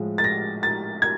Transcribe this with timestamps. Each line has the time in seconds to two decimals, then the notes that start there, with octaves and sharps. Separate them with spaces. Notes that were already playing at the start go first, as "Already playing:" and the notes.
Already playing: A2 F3 G#3
0.18 A6
0.24 A#6
0.63 A6
1.02 G#6